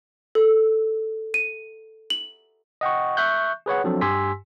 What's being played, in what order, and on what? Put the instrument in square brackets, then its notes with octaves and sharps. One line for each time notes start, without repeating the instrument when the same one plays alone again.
[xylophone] A4
D#7
F#7
[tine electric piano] D#5 F#5 G5 C#6
E5 C#6 F#6 G6
G#4 B4 C#5 F#5
F3 F#3 C4 D4 A4
G2 G4 G#5 C6 E6 B6